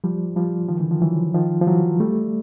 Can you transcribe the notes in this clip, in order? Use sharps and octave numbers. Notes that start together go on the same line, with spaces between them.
F3 G3
F3 G3
D#3 F3
D3 E3
D#3 F3
E3 F#3
D#3 F3
F3
E3 F#3
G3 A3